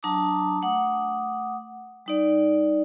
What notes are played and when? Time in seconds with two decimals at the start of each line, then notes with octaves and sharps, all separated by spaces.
0.03 F#3 D4 A5 A#5 D6 D#6
0.62 A3 F#5 D6 D#6
2.06 G3 D#4 D5